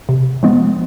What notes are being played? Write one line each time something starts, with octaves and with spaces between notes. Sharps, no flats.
C3
F3 G#3 B3